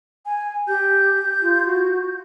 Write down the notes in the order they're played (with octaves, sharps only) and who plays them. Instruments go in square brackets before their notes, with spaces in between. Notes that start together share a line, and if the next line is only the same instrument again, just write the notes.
[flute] G#5
[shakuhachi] G4 [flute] G6
[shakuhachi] F4
F#4